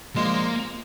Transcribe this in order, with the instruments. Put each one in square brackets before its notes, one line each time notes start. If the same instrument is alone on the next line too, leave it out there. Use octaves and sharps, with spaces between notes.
[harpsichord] F3 G#3 D4 [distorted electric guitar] A#3